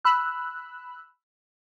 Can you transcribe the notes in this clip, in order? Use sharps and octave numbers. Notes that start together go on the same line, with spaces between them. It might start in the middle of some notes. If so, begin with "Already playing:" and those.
B5 E6 F#6